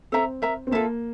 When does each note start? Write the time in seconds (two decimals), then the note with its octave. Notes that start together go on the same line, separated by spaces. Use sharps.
0.12 C4 A4 E5 A#5
0.42 A#4 E5 A#5
0.67 C4
0.71 A#3 F4 A4 E5 A5